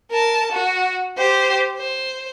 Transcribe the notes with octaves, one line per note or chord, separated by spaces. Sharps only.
A#4 A5
F#4
G4 C5
C5